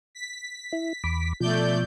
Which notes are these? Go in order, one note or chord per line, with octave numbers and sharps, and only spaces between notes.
B6
E4
E2 B5 D6
B2 F3 A3 D5 G6